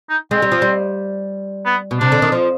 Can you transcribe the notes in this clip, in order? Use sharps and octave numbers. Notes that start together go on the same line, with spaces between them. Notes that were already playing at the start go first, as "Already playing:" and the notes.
D#4
G#3 C4
G3
F3
G3
B3
B2
C3 D4
D3
D#3
F3